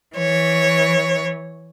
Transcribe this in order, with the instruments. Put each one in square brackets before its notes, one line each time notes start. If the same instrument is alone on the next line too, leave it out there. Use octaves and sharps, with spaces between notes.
[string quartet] E3 C#5